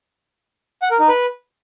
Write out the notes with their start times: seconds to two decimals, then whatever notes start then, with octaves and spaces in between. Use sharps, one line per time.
0.82 F#5
0.91 A#4
1.00 D#4
1.08 B4